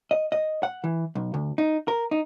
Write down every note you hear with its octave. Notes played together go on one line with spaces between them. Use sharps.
D#5
D#5
F#5
E3
B1
D2
D#4
A#4
D#4